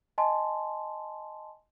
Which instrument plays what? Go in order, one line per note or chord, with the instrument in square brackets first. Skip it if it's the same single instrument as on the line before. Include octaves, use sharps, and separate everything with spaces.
[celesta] D#5 G#5 A5 C6